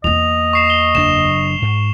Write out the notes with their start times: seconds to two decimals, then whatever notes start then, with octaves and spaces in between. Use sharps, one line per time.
0.04 E2 A#3 D#5 F7
0.53 C#6 C7 E7
0.70 G7
0.95 F#1 F#3 D4 E7
1.62 G#2